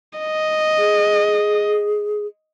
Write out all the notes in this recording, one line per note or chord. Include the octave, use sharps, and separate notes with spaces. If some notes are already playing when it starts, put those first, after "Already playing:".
D#5
G#4